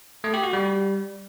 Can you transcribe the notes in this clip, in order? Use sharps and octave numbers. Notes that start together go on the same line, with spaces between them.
A3
G4
F#4
G3